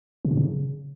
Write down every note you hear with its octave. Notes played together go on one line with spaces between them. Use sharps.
C3
A2
C#3